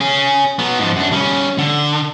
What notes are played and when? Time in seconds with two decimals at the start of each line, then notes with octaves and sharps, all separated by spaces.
0.01 C#4 G#4
0.59 F#3 B3
0.79 G#2 F3
0.96 F#2 D4
1.12 G3 C#4
1.58 D3